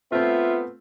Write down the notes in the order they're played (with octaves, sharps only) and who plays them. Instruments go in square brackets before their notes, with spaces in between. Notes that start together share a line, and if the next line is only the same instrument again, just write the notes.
[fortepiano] A3 C4 [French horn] B3 [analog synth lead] F4 [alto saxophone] E5